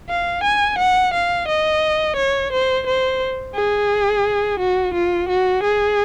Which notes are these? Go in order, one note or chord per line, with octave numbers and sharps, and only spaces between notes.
F5
G#5
F#5
F5
D#5
C#5
C5
C5
G#4
F#4
F4
F#4
G#4